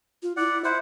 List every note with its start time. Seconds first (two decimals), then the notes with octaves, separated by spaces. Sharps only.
0.23 F4
0.37 E4 D5 F#5
0.65 E4 C5 E5 F#5